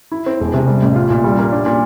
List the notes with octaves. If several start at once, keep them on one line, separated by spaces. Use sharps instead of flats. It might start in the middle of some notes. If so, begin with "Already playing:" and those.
E4
C4
E1
C3
G3
A1
F4
A#2
G3
A#3
D4
A#2